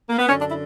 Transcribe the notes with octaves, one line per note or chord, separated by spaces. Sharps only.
A#3
B3
F#2 D3 C#4
D4
E4